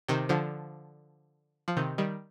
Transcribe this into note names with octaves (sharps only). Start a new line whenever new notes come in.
C3 D#3
D3 F3
F3
C3 D#3
D#3 G3